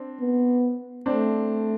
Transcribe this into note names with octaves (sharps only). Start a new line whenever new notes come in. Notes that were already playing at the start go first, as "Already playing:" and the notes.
Already playing: C4 D4
B3
A3 C4 D4